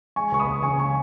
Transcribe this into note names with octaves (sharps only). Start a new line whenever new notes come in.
G#3 G#5 C#6
C#2 C#6
B5 D#6
C#2
C#3 G#5 C#6
G#3 G#5 C#6